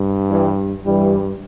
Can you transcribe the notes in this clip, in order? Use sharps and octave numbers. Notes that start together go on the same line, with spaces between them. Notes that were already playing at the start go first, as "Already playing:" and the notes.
Already playing: G2
E3 G3
G2 E3 G3